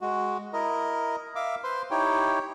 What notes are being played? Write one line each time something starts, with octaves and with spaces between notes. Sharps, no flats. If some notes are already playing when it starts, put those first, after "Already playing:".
G#3 F#4
E4 A#4 D#5
E5 F5 D6
B4 C5 C6
D#4 E4 G4 C#5 G5